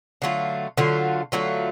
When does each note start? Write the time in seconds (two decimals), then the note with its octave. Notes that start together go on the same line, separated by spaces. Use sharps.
0.22 D3 F#3 A3 F4
0.77 D3 F#3 A3 F4
1.32 D3 F#3 A3 F4